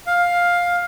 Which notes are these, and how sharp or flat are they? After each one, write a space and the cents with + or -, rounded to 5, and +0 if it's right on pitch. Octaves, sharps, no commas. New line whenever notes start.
F5 +10